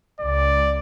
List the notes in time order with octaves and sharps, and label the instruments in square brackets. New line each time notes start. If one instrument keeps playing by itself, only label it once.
[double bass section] C#2 [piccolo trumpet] D5